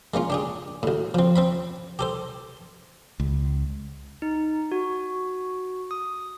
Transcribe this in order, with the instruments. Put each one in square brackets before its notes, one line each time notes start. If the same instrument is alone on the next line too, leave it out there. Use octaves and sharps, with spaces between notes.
[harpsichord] G#3 A#3 C#4 F4
D4 G4 G#4
D2 A2
F3 C4
C4 E5 B5
G4 A4 C5
[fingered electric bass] C#2
[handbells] D#4
F#4
D#6